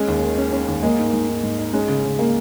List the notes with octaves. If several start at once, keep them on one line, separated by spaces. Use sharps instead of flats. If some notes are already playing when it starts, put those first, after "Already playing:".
Already playing: G#3 C#4
D#2
D#3
C#4
C#4
D#2
G#3 A#3
G#2
G#2
G#2
G#2
D#4
G#3 C#4
C#3
C#3
A#3 G#4